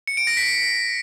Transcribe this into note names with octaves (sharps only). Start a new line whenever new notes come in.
C#7
D7
A#6
B6